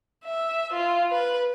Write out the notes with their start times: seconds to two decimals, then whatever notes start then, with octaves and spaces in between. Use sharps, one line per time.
0.24 E5
0.73 F4
1.11 B4